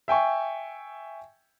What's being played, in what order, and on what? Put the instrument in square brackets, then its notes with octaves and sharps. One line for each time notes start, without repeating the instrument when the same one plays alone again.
[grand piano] E5 G5 G#5 C#6